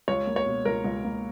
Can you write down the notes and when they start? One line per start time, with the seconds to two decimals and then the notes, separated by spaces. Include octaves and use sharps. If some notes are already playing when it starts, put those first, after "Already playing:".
0.08 C#2 C#5
0.27 A#3
0.36 C#5
0.46 B2
0.65 C#2 A#4
0.85 C#2
1.04 A#3